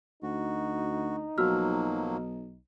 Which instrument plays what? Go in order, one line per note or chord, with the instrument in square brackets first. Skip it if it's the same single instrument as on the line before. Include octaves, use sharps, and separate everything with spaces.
[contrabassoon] D2 [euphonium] D#4 [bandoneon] F#4
[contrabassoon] B1 [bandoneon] F3 F#3 A#3 [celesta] F#4 E6 F6